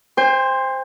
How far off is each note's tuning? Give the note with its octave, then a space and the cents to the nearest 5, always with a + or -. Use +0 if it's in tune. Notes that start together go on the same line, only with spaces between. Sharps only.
C5 +0 G5 +40